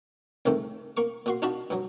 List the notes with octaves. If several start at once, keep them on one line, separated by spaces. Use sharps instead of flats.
C2 G#2 C3 D#3 A3
A#3 C#6 D6
A#2 F#4 C6
D4 D#4 F4 F#4 A5 B5
G2 F#3